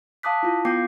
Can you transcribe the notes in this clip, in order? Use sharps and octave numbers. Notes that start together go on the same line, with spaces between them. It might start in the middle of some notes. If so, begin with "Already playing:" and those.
F5 A5 D6 D#6 F#6 B6
E4 F4
B3 F4 G5 D6 G6 C7